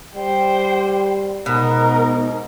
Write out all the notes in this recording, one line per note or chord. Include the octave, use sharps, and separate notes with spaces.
G3 C5 G5
G#2 B2 D#4 A#4